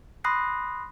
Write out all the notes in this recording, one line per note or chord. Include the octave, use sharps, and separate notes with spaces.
B5 C6 D#6 F#6 A#6 C7